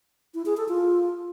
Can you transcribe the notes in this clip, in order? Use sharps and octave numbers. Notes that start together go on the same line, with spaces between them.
E4
G#4
A4
F4